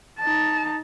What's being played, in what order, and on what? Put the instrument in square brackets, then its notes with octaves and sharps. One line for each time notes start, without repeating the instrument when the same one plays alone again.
[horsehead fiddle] D#4 A5